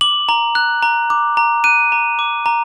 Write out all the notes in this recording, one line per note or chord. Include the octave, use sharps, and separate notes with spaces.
D6 F#7
A#5
F#6
A#5
D6
A#5
F#6 D#7
A#5
D6
A#5